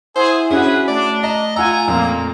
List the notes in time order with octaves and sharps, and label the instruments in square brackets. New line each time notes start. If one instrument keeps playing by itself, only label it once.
[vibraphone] E4 E5 F#5 [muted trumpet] G#4 [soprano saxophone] C5
[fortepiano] C#4 E4 F#4 [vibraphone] D4 [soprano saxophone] G#4 [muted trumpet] B4
[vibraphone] A3 [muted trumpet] D4 [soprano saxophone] D5
[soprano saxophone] D#5 [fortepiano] A#5
[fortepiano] F4 F#5 E6 [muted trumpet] G#5 [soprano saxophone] A#5
[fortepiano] F2 A#2 [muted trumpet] A#3